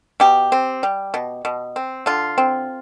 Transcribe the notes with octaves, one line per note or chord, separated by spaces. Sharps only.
B2 G4
C4
G3
B2
B2
C4
D3 F4
C4